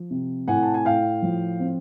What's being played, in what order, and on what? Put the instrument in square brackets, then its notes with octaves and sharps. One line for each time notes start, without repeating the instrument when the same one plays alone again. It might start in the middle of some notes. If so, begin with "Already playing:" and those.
Already playing: [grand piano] F3
C3
A2 F#5 G#5
A5
G#5
A2 F5 G5
F3
C4